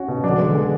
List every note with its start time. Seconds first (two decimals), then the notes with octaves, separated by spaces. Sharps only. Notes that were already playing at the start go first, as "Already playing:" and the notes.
Already playing: C#4 F#4
0.08 B2
0.24 F#3 D4
0.30 D3
0.35 E3
0.39 G#3
0.44 D3
0.55 G#3